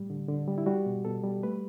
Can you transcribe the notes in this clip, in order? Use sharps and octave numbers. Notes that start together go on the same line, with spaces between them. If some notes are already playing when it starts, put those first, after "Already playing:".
Already playing: A2 G3
D3
D3
G3
E4
G3 F#4
B2
B2 A4
G3
A3 B4